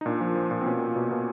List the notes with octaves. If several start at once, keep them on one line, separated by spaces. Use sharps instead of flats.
D#4
A#2 D4
F3
F3
A#2
C4
B2 C#4
B2
B2
B2